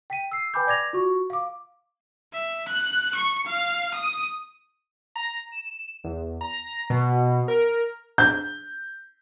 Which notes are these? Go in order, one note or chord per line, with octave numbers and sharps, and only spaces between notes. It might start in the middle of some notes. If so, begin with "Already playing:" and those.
G5 B6 D#7
E6 C7
B4 G5 G#5 B5 D6 G6
D5 D6 G#6 A#6 F7
F4 F#4 C#6
F5 D6
E5
F#6
C#6
F5
D#6
A#5
E7
E2
A#5
B2
A#4
G6